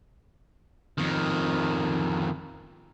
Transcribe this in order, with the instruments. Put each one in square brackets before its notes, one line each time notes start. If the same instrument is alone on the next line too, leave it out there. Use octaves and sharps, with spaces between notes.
[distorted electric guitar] F2 D#3